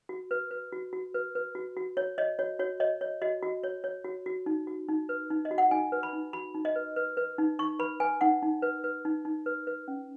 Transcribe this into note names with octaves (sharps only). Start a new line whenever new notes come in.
F#4
B4
B4
F#4
F#4
B4
B4
F#4
F#4
C#5
C#5 D#5
F#4 C#5
F#4 C#5
C#5 D#5
C#5
F#4 D#5
F#4
C#5
C#5
F#4
F#4
D#4
F#4
D#4
B4
D#4
D#5
F#4
F#5
D#4 G#5
B4
B5
D#4
F#4 B5
D#4
D#5
B4
B4
B4
D#4
D#4 C#6
B4 B5
B4 G#5
D#4 F#5
D#4
B4
B4
D#4
D#4
B4
B4
C#4